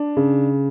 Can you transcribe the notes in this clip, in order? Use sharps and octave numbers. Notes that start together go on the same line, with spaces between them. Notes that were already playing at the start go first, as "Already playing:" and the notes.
Already playing: D4
C#3